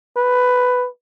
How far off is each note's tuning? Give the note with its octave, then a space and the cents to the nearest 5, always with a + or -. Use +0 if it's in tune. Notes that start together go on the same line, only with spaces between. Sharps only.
B4 +10